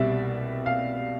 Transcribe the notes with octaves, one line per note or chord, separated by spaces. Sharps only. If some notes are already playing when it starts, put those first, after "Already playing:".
Already playing: C2 B2 G3 D5 E5
F5